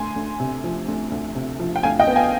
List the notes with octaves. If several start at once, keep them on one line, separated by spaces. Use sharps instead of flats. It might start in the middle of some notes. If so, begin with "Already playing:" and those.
Already playing: D2 G#5 C6
D2
C3
F3
D2
D2
C3
F3
G5
D2 F5 G#5
D#5 G5
B3
F5 G#5